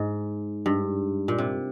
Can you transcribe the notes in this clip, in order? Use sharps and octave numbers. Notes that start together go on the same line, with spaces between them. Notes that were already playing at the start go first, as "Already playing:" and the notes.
Already playing: G#2
G2
A#2
C3